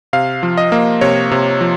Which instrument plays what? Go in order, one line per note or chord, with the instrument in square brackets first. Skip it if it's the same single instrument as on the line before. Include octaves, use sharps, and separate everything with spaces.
[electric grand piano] C3 F5
F3
D#5
A#3
C3 C#5
C3
F3